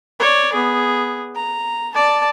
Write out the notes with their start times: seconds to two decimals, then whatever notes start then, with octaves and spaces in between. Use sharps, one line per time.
0.19 C#5 D5
0.53 B3 G#4
1.35 A#5
1.95 D5 A5